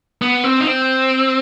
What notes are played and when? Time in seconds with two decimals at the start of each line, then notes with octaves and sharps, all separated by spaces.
0.22 B3
0.44 C4
0.60 D#4
0.67 C4